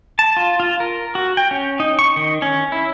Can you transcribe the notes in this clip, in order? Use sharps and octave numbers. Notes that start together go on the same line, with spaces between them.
A5
F4
F4
A#4
F#4
G5
C#4
D#4
C#6
D#3
C#4
E4